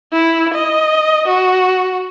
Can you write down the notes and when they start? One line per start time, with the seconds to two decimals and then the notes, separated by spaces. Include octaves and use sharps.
0.13 E4
0.54 D#5
1.27 F#4